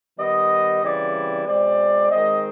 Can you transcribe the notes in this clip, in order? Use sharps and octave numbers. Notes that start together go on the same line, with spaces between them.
D#3 G3 B3 D#5
C#3 E3 G3 C4 D5
B2 G#3 C4 D5
D#3 G#3 C4 D#5